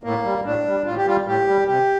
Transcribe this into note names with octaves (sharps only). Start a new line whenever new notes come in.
A2 A#3
G3
A2 D4
G3
A2 F4
G4
G3 F4
A2 G4
G3
C3 G4